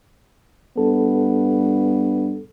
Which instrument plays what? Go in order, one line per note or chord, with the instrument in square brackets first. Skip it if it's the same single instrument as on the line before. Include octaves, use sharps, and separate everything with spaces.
[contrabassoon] G2 [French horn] B3 [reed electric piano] A4